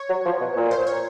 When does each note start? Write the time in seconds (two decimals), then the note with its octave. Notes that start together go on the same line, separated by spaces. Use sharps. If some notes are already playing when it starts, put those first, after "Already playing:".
Already playing: C#5
0.10 F#3
0.25 F3
0.41 B2
0.56 A#2
0.71 C5
0.87 C#5